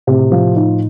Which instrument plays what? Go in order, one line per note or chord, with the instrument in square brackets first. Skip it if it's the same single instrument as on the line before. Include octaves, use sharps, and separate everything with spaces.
[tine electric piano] A2 [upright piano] C3
[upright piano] F3
D#4